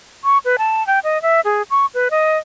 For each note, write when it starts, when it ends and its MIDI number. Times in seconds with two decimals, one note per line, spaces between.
0.24 0.38 85
0.45 0.56 71
0.58 0.85 81
0.87 0.99 79
1.04 1.21 75
1.22 1.41 76
1.45 1.62 68
1.70 1.86 85
1.94 2.08 71
2.11 2.38 75